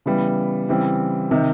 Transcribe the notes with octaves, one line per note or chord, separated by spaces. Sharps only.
C#3 E3 G3 B3
C#3 E3 G3 C4 E4
C3 D#3